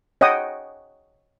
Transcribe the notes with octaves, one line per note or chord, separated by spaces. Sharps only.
C#5 D#5 F#5 G5 D#6